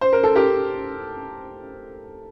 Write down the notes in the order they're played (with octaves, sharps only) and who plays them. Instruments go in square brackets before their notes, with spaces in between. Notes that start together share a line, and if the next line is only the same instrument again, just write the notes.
[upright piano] C5
A#4
A4
G4 A#4